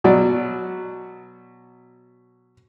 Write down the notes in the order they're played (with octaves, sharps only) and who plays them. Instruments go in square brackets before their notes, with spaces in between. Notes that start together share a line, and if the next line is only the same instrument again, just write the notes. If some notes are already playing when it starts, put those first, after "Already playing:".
[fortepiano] B2 F#3 D5